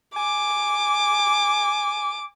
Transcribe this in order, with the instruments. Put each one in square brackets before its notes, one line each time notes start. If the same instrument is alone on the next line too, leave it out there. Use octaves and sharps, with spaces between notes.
[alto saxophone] G#5 [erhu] D6